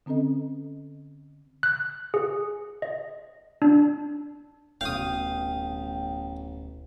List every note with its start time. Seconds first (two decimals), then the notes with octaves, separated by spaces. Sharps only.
0.06 D3 C4 C#4 A4 D#5
1.63 F#6
2.14 G#4
2.82 D#5
3.62 D4
4.81 D1 A1 B2 F5 G5 D#6